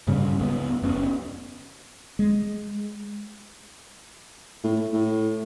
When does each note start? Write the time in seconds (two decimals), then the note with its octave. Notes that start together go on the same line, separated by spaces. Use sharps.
0.07 G2 C#3 G3 C#4
0.39 C#2 G#3 B3
0.82 F#1 B3 C#4
2.19 G#3
4.64 A2
4.93 A2